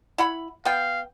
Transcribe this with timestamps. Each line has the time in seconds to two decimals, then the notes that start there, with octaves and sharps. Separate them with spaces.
0.18 E4 F#5 B5
0.65 B3 F5 G5